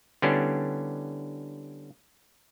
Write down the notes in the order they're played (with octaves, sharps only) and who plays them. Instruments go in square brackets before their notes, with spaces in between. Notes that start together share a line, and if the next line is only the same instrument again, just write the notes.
[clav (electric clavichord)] D3 G3 B3 C#4 D4 E4